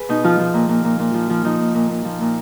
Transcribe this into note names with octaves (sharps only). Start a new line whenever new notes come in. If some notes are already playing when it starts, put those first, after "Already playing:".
Already playing: G#4 B4
B2 D#4
F3 F4
F3
A#2
A#2
A#2
A#2
F3
F3
F3 D#4
A#2
A#2
A#2
F3
A#2